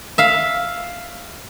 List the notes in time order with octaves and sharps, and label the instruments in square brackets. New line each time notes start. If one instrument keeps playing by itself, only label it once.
[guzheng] E5 F5